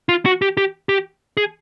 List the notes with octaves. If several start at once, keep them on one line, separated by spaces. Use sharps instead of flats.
F4
F#4
G4
G4
G4
G#4